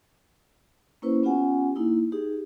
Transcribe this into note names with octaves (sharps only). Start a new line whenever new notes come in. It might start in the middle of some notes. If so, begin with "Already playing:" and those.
A#3 C#4 E4 B4 C5
B3 C#4 F4 G4 F#5 G#5
A#3 D#4 E4
D#4 G4 G#4